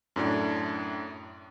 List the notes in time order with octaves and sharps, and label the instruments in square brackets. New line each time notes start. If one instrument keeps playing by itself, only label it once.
[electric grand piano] F#2 A2 D4